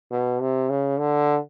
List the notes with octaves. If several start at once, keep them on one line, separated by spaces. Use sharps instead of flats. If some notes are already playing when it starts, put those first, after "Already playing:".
B2
C3
C#3
D3